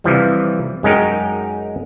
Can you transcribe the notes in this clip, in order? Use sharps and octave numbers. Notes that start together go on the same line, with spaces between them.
C3 E3 F3 G3
F#2 G#3 C#4 D#4 A#4 G5